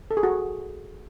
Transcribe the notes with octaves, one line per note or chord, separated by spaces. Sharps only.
A4
G#4
F#4